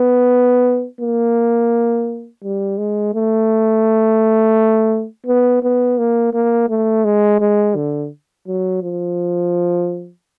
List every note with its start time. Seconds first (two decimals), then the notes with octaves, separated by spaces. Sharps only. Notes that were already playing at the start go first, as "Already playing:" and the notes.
Already playing: B3
1.00 A#3
2.43 G3
2.78 G#3
3.14 A3
5.26 B3
5.63 B3
5.98 A#3
6.34 A#3
6.69 A3
7.04 G#3
7.40 G#3
7.75 D3
8.47 F#3
8.82 F3